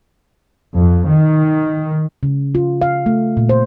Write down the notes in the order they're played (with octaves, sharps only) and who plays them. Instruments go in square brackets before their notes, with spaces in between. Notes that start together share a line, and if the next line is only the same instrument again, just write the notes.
[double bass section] F2
D#3
[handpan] C#3
F4
F5
A3
A#2
C5